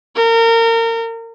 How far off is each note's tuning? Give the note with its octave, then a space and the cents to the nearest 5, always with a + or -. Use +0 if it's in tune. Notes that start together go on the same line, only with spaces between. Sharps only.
A#4 -30